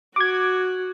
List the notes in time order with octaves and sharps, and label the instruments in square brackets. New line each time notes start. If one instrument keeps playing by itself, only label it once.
[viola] F#4 [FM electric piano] D6 G#6